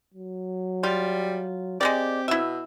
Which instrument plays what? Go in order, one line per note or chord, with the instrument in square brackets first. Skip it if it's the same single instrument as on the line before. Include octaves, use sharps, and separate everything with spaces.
[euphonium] F#3
[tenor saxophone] G3 [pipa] F4
[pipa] G#3 A#3 D5 [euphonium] C4 [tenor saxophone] G4
[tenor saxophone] B2 [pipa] E4 E5